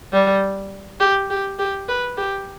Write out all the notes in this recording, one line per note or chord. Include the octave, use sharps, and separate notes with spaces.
G3
G4
G4
G4
B4
G4